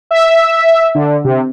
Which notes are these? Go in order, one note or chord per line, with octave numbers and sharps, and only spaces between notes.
E5
D3
C3